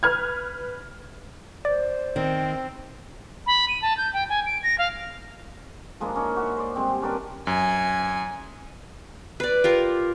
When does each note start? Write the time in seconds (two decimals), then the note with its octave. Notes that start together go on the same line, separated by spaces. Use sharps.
0.03 B4 F6 G#6
1.65 C5 D5
2.16 D#3 C4
3.47 B5
3.68 D#7
3.82 A5
3.97 G6
4.13 G5
4.29 G#5
4.46 D7
4.63 A#6
4.78 F5
6.00 F3 G#3 A#3 D4
6.16 C#4 D#4
6.37 F#4 E5
6.57 C5 D5
6.75 G3 G#3 C4
7.02 C#4 D4 A#4 B4
7.47 F#2 G#5
9.40 B4 D5
9.64 F4 G4 A#4